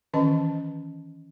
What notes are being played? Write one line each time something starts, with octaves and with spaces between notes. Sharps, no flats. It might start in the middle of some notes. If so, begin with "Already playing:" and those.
D#3 E3 C#4 B4 D#5 A5